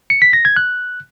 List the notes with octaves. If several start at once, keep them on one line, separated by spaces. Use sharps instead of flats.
C#7
B6
A#6
G#6
F#6